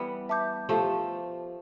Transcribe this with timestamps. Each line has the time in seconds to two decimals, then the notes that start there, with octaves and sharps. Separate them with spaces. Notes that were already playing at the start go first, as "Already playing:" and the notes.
Already playing: E3 G3 B3
0.29 E5 A5 D6 G6
0.69 F3 A3 G4 C5 F5